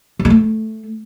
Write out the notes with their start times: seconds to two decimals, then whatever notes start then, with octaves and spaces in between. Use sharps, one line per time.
0.19 C#3
0.25 G#3
0.30 A3